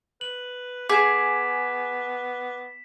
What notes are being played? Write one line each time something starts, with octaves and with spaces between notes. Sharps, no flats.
B4 F#7
B3 G#4 D6 B6 E7